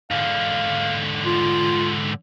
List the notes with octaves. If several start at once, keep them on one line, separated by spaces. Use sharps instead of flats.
G#2 D3 F5
F4